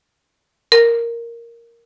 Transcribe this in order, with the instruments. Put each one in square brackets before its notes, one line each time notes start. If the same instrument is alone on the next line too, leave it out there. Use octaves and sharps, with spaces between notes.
[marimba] A#4